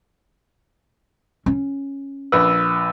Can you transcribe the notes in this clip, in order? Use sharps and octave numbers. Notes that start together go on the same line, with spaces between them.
C#4
A#1 B4 E6